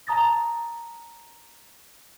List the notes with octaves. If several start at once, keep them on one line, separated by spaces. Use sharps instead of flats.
A5 A#5 D#6 A6 A#6